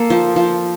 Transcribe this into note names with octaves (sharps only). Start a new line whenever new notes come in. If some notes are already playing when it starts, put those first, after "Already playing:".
Already playing: A#3 A4
F3
F3